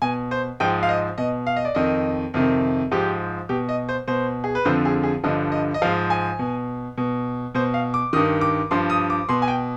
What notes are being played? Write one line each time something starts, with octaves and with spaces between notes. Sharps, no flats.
B2 G#5
C5
G#2 F3 G5
F5
D#5
B2 D#5
F5
D#5
D5
F2 D#3 D#5
F2 C3 D#3
G#2 F3 G4
B2 G4
D#5
C5
B2 C5
G#4
B4
F2 D3 F3 C5
G#4
G#4
G2 D3 F3 D#5
D#5
D#5
G#2 F3 F5
G#5
B2
B2
B2 C5
F5
D6
G2 D#3 D#6
D6
G2 F3 C6
D#6
D6
B2 C6
G#5
G5